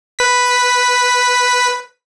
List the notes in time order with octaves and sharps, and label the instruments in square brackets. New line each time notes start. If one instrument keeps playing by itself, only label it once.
[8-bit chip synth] B4 B6